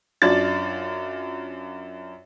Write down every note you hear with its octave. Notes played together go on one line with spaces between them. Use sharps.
F#2 D4 F4 A6